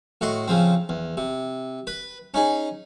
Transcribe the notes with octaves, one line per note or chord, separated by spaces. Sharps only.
A2 F#4 D#5 C6
C#3 F3 C4
E2
C3
B4
C#4 D#4 G#4